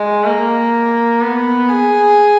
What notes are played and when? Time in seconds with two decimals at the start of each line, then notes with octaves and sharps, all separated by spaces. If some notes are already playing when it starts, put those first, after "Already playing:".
Already playing: G#3
0.25 A#3
1.21 B3
1.69 G#4